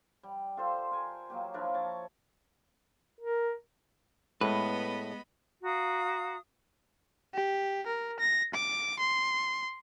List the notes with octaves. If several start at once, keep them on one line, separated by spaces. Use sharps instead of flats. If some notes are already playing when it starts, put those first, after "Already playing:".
G3
F4 A4 C5 C6
A#4 G#5
F#3 A#3 G4
F3 D4 E4 A#4
C#5 A5
A#4
A2 G#3 B3 B4 D#5 B5
F#4 F5 A#5 D#6
G4
A#4
A#6
D6
C6